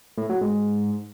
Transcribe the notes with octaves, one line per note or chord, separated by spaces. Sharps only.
A2
F#3
G#2